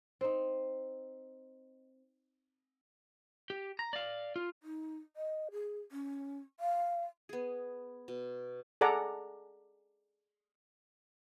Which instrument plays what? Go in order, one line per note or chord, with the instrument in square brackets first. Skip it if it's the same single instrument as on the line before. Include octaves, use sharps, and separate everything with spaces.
[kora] C4 D#4
[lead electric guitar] G4
A#5
D5 F5
F4
[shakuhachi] D#4
D#5
G#4
C#4
F5
[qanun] B3 G#4
B2
[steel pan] G#4 A4 D5 F#5 A#5